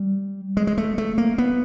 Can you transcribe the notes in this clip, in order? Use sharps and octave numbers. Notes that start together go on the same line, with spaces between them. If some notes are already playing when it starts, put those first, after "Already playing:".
Already playing: G3
G#3
G#3
A3
A3
A#3
B3